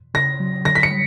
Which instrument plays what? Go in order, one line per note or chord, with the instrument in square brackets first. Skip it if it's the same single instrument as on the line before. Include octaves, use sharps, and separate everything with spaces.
[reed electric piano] C#3 [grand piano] A#6
[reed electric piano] F#3
[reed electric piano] D3 [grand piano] A#6
[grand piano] B6
C#7
[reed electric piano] G3